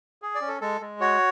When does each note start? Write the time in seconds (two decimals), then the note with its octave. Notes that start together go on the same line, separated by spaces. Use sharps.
0.22 G#4
0.35 D5
0.41 C#4
0.48 A4
0.61 G#3 A4
0.81 G#3
1.00 F#4 C#5